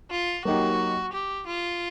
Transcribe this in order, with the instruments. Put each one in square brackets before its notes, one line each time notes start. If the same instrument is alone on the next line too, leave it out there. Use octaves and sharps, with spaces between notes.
[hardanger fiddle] F4
[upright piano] F#3 A#3 D#4 G4 [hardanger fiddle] F#4
[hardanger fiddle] G4
F4